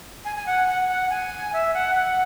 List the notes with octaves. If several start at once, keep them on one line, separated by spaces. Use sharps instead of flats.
G#5
G#5
F#5
F#5
F#5
G#5
E5
F#5
F#5